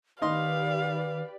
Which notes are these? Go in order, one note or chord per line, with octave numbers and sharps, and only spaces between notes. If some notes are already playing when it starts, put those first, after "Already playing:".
D#3 D#4 G4 B4 D5 D#5 F5 C6